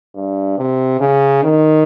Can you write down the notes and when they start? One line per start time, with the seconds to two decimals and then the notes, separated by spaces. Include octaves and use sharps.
0.15 G2
0.58 C3
1.00 C#3
1.43 D#3